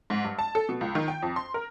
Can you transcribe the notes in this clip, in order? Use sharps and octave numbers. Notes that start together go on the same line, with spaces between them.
G#2
G2
A5
A4
B2
C#2
D#3
G5
F2
C6
A#4